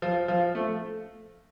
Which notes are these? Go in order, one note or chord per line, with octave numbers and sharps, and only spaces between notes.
F3
F3
A3